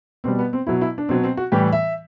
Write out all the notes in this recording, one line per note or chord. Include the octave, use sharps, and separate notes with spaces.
B2 G3 C4
B3
C4
B2 F#3 E4
E4
D4
B2 F#3 C4
C4
F#4
A2 E3 G3 G4
E5